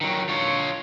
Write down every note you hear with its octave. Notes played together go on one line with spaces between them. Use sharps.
D#3 F#3
F4 C#5